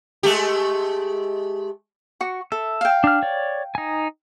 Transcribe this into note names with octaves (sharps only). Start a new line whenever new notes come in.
G#3 A3 G4
F#4 C#6
A4 E5
F5 G5
D4 F6
C#5 D5
D#4 G#5